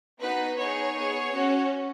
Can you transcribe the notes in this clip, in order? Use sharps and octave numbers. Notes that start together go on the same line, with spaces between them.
B3 D#4 F#4 B4
B3 D#4 G#4 C#5
B3 G#4
C#4 F#4